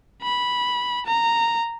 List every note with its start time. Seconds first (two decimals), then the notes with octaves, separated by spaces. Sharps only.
0.23 B5
1.07 A#5